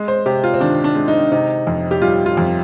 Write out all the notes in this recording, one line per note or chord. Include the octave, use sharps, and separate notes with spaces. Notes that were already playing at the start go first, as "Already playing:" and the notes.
Already playing: G#3
C5
C3 G4
F4
C4
D#3 D4
D4
G#3
D#4
C3 D#4
F2
G4
G3 F4
F4
F2